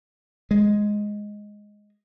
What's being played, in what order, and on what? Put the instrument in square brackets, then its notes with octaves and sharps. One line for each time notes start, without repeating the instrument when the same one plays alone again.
[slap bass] G#3